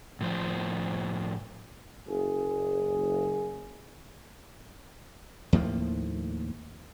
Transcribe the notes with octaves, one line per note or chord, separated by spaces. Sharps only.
A2 F3 C5
F#1 G#4
D#2 A2 F3 A#3